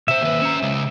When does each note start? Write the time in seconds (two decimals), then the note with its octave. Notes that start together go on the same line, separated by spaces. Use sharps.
0.08 C3 C5 E5
0.21 D#2 B4
0.42 C#4 A#5
0.63 C#3 G#3